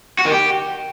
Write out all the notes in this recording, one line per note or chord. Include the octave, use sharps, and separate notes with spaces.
F#4
D#3
G4